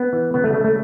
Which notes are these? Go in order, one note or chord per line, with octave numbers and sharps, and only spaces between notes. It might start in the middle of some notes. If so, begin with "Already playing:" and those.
Already playing: B3
E3
C#3 B3
A3
C#3 A3
A3